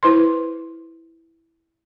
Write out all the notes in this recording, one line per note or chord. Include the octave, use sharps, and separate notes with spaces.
E4 B4 C5 C6